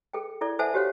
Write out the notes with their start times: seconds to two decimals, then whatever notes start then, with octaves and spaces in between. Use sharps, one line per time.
0.13 G#4 A4 G5
0.41 E4 A4 D5
0.59 A4 C5 E5 F#5 G#5 A5
0.74 F#4 G4 C5 C#5 F5 F#5